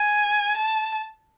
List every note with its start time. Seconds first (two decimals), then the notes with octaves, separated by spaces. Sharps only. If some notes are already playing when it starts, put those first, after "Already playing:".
Already playing: G#5
0.57 A5